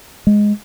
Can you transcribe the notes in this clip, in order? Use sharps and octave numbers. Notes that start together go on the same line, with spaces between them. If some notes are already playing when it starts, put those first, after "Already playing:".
G#3